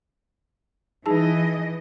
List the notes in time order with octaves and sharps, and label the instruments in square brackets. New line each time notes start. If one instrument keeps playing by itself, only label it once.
[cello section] E3 D#5 [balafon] D#4 G#4 A5